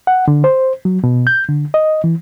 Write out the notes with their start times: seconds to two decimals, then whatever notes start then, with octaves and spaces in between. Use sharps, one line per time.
0.07 F#5
0.28 D3
0.44 C5
0.85 F#3
1.04 B2
1.27 G6
1.49 D3
1.74 D#5
2.04 E3